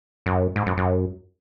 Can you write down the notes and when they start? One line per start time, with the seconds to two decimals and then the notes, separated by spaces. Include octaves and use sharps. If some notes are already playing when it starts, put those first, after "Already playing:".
0.26 F#2
0.56 G#2
0.66 F#2
0.77 F#2